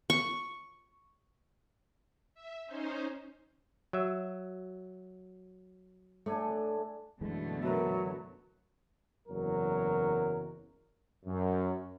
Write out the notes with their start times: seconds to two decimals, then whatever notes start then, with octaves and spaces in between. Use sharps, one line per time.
0.10 C#6
2.34 E5
2.66 C#4 D#4 C5
3.93 F#3 E5
6.26 A2 A3 D4 G#5
7.21 F#2 B2 D3 E3 G#3 A3
7.63 F#3 A#4 B4 E5
9.28 F#1 E2 F#3 A#4
11.26 F#2